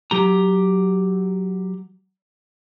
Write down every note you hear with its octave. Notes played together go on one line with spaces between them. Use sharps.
F#3 G4 A#5